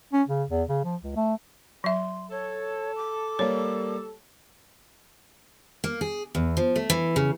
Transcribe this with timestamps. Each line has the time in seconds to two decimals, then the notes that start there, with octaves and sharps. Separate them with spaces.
0.13 C#4
0.28 C#3
0.49 E2
0.68 C#3
0.84 F3
1.03 C#2
1.16 A3
1.84 F#3 E5 C6
2.31 A4 C#5
2.96 D6
3.39 G3 A#3 C#5
5.84 A#3
6.01 G#4
6.35 E2
6.57 F3
6.76 A3
6.90 E3
7.16 C#3